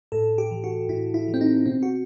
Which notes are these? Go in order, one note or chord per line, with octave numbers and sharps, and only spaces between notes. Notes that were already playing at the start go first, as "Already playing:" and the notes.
A2 A4
G4
E3
F#4
A2 E4
E4
E3
C4
D#4
B2 C4
F#4